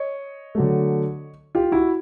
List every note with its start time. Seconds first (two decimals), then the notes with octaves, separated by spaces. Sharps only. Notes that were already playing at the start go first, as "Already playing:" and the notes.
Already playing: C#5 D#5
0.55 D3 F#3 A3
1.55 F4 G4
1.72 E4 F#4